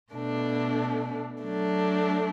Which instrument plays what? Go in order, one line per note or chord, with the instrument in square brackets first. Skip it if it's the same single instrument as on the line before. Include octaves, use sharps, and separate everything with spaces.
[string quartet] B2 A3 D4
F#3 A3 D4